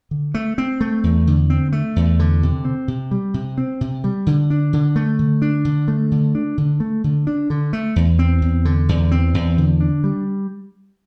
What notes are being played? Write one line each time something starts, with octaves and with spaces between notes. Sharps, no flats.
D3
A3
C4
A3
E2
D3
C4
A3
E2
D3
C3
C4
C3
G3
C3
C4
C3
G3
D3
D4
D3
A3
D3
D4
D3
A3
D3
D4
D3
A3
D3
D4
D3
A3
E2
C4
E2
D3
E2
C4
E2
D3
D4
G3